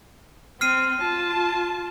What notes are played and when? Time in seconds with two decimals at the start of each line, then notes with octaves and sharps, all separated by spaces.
0.61 C4 F6 C7 D#7
1.01 F4 A5